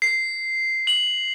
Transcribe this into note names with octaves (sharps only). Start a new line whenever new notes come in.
C7
F#7